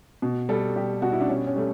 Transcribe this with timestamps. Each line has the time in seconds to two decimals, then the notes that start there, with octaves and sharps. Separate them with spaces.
0.22 B2
0.49 G3 A4
0.76 G3 G4
1.02 B2 F#4
1.12 E4
1.21 D4
1.28 G3 C#4
1.47 C#4
1.56 G3 A3